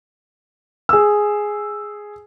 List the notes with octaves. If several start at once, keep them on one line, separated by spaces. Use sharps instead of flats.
G#4 E6